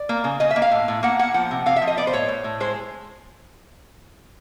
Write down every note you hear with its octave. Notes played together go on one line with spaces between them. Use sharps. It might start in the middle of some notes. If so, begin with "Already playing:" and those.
Already playing: D5
A#3
C#3
C#3 D#5
E5
A#3
F5
A2
A2
A#3 F#5
A#3 F#5
F3 F#5
C3
C3 F5
E5
F3
D#5
B3 D5
C5
A2 C#5
A2
A2
G#3 C5